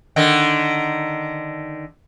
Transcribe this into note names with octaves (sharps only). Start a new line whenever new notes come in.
D3 D#3 D#4